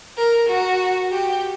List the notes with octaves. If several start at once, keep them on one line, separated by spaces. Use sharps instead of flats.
A#4
F#4
G4